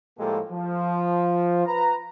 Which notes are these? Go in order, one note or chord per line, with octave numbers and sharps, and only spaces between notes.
A2 F3 G#3 A#3 G4 A4
F3
B4 A#5